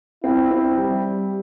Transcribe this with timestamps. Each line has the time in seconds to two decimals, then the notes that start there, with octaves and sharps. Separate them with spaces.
0.23 C4 E4
0.51 C4
0.77 G3